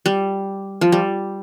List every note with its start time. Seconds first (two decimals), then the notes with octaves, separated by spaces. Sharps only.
0.06 G3
0.81 F3
0.92 G3